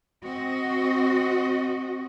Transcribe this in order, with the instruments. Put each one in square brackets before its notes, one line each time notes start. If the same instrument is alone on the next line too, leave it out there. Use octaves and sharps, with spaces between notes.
[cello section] C4 F#4 D#5